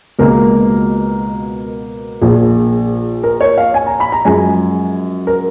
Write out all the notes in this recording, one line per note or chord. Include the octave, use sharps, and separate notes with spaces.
C#2 B2 A#3 A#4
A#1 A#2 F3 G#4
A#4
C#5
F5
G#5
A#5
B5
A#5
F#2 F3 G#3 G#5
A#4